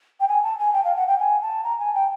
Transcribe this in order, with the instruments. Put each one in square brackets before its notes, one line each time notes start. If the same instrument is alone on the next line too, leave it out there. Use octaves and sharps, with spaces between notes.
[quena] G5
G#5
A5
G#5
G5
F5
F#5
G5
G#5
A5
A#5
G#5
G5